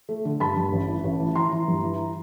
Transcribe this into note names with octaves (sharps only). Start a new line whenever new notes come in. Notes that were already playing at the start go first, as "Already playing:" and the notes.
A3
D3
G2 A5 B5
G2
A1
E3
A1
E3
E3 A#5 C6
E3
G2
E3